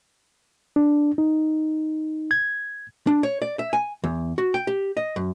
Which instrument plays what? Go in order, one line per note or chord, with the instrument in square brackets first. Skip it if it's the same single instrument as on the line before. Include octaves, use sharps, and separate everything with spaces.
[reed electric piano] D4
D#4
G#6
[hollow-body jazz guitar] D4
C#5
D5
E5
G#5
E2
F#4
G5
G4
D#5
F#2